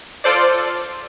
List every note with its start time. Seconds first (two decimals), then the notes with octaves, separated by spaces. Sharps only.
0.24 F4 A4 C5 D5